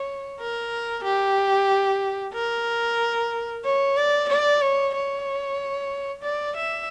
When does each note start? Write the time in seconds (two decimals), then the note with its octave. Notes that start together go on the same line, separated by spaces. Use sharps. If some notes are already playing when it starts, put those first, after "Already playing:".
Already playing: C#5
0.39 A#4
1.04 G4
2.34 A#4
3.64 C#5
3.96 D5
4.29 D5
4.61 C#5
4.94 C#5
6.23 D5
6.57 E5